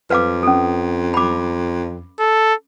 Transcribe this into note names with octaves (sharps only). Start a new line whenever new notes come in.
F2 B4 F5 D6
C#4 A4
B5 D6
A4